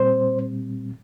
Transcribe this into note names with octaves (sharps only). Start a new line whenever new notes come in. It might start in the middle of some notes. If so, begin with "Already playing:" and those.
Already playing: A#2 G3 C4 C5